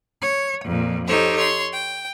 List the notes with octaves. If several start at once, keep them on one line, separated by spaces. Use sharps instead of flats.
C#5
F2 A#2
D#4 G4 A4 C5 C#5
C#5 C6
G5